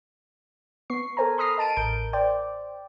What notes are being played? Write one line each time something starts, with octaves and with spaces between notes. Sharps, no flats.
B3 C#6 C7
A4 A#4 C5 G#5 A#5
B5 C6 D#6 F6 A#6 C7
D#5 A5 D7 D#7
A1 A#4 G6 D7
C5 D5 G5